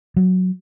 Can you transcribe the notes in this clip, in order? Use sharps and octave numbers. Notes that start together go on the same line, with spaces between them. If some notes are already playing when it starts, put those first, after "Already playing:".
F#3